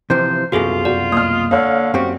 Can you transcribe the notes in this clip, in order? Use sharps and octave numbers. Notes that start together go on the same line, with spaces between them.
C3 E3 F3 C5
C2 F#2 B2 F4 F#4 G#4 A4
F#4 D5
A#3 D#6 F6
D3 C#5 F5
F#2 C4 F#4 G4